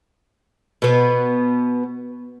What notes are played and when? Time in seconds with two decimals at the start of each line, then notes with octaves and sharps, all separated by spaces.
0.82 B2 B3